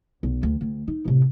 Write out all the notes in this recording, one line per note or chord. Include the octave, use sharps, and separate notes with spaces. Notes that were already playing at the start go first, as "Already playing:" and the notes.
B1
D2
D2
D#4
A2 C3